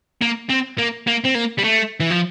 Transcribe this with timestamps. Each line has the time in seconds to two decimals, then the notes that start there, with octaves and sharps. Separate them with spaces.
0.22 A#3
0.50 C4
0.78 A#3
1.07 A#3
1.24 C4
1.35 A#3
1.58 G3
1.64 A3
2.00 E3
2.10 F3